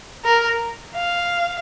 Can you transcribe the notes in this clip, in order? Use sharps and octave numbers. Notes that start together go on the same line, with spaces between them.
A#4
F5